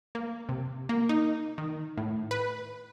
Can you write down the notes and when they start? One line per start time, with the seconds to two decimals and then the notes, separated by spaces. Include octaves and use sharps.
0.15 A#3
0.49 C3
0.89 A#3
1.09 D#4
1.58 D#3
1.98 A2
2.31 B4